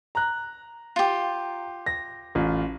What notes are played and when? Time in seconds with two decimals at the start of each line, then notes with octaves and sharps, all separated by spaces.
0.15 A#5 F#6
0.96 F4 G4
1.86 A#6
2.35 A1 F4